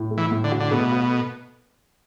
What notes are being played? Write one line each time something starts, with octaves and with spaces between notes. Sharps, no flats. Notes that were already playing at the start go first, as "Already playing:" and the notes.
Already playing: A2
A3
E3
A2
D3
F#4
D3
B2 A3
F#4